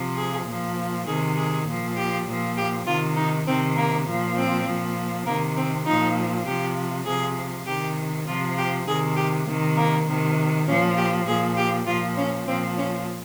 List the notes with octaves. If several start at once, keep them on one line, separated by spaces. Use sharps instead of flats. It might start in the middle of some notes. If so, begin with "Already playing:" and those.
Already playing: C3 F3
G#4
A#2 F3
C3 D#3 G#4
G#4
A#2 F3
G4
A#2 F3
G4
C3 D#3 F4
D#4
C3 D#3 C4
A#3
A#2 F3
C4
A#2 F3
C3 D#3 A#3
C4
A#2 F3 D#4
C3 F3 G4
C3 F3 G#4
C3 D#3 G4
C3 F3 F4
G4
C3 D#3 G#4
G4
C3 D#3 A#3
A#3
C3 D#3
A#2 F3 C#4
G4
A#2 F3 G#4
G4
A#2 F3 F4
C#4
A#2 F3 C4
C#4